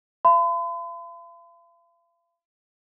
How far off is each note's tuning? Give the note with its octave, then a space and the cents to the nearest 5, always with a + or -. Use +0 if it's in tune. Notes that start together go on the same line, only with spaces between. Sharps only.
F5 -40 B5 +45